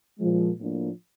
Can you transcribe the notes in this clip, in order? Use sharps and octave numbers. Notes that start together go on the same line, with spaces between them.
A#2 F3 G#3
A2 F3 A#3 D4